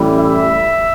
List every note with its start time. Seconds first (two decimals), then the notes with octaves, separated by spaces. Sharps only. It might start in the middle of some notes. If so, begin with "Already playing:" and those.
Already playing: A1 A2 E3 G3
0.17 E5